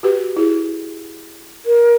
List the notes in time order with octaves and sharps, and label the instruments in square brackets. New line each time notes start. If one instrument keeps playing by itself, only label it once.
[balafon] F#4 G4 B4
E4 G#4
[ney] A#4